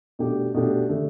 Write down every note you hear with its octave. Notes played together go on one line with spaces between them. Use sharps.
B2 A3 D4 G4
B2 A3 D4 G4
D3 A3